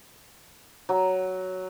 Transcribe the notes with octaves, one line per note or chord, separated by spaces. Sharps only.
F#3